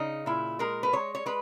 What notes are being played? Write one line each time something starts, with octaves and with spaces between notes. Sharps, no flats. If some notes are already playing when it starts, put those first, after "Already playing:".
Already playing: C#3 D#4
A#2 E4
G#3 A#4
B4
G#3 C#5
C#5
G#3 B4